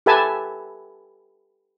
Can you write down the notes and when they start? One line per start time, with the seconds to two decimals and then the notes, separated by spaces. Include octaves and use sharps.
0.06 G4 A4 B4 E5 G#5 A5